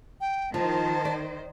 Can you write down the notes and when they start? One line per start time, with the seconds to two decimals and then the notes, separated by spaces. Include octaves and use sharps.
0.21 G5
0.54 D#3 F3 C5 A5
1.05 D5